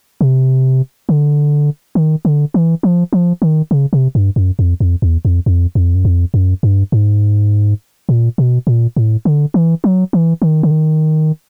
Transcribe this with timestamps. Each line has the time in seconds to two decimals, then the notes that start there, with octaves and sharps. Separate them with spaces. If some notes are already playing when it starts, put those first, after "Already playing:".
0.21 C3
1.09 D3
1.95 D#3
2.25 D3
2.54 E3
2.83 F3
3.13 F3
3.42 D#3
3.71 C#3
3.93 C3
4.15 G2
4.36 F#2
4.59 F2
4.80 F2
5.02 E2
5.25 F2
5.46 F2
5.75 F2
5.95 F#2
6.05 F2
6.34 F#2
6.63 G2
6.92 G#2
8.09 A#2
8.38 B2
8.67 A#2
8.97 A2
9.25 D3
9.54 E3
9.84 F#3
10.13 E3
10.42 D#3
10.63 D3
10.71 D#3